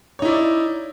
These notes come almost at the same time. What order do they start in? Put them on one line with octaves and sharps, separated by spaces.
C#5 D#4 E4 D5